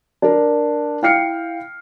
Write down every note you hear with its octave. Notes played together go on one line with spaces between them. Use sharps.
D4 A#4
E4 F5 G5 F6 C7 C#7